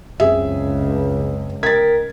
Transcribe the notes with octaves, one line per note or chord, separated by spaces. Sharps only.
C#2 F#2 C4 G#4 E5
A#4 D#5 G5 G#6 A6 B6